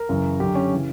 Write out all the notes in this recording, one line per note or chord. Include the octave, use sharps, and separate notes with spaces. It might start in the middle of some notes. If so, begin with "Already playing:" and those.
Already playing: A#4
F#2 C#3 E3
F#2 D3 G4
C#4
C#3 E3